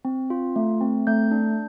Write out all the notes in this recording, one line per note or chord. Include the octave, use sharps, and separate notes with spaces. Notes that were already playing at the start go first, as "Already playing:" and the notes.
C4
F4
A3
C4
A3 G6
D4